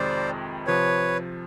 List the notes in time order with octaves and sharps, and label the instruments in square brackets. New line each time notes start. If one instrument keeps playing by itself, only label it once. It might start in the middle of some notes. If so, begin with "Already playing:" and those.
Already playing: [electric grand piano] F2 C3 D#3 G#3 [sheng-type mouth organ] C5 D5
[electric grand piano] C3 F3 [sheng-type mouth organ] B4 C#5